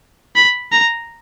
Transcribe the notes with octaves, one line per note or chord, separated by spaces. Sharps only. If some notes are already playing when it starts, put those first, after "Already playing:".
B5
A#5